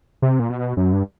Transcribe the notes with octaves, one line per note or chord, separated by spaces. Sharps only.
C3
A#2
B2
F#2
G2